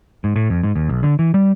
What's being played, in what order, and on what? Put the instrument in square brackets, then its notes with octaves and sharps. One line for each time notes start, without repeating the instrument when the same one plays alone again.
[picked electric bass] G#2
A2
F2
G#2
D#2
B1
D3
E3
G3